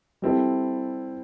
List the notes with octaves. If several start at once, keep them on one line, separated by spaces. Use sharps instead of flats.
G3 C4 E4 A4